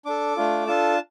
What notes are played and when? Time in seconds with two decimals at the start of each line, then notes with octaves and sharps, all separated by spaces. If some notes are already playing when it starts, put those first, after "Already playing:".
0.05 D4 A4 D6
0.37 A3 D4 F4
0.67 D4 F4 A4 A5